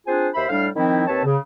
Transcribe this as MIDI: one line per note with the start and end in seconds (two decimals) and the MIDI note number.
0.07 0.28 60
0.07 0.28 62
0.07 0.28 65
0.07 0.28 68
0.07 0.28 72
0.07 0.28 80
0.34 0.45 39
0.34 0.45 72
0.34 0.45 76
0.34 0.45 83
0.49 0.68 45
0.49 0.68 55
0.49 0.68 62
0.49 0.68 77
0.76 1.03 51
0.76 1.03 53
0.76 1.03 60
0.76 1.03 63
0.76 1.03 64
1.07 1.23 39
1.07 1.23 60
1.07 1.23 71
1.07 1.23 73
1.07 1.23 81
1.25 1.37 49